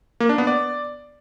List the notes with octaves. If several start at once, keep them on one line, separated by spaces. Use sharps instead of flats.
A#3
D4
B3
D5